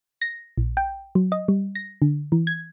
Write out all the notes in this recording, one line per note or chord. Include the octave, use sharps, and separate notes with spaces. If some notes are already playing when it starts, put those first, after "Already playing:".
A#6
A#1
G5
F#3
D#5
G3
A#6
D3
E3
G#6